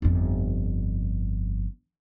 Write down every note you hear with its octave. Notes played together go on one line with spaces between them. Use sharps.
G1 F2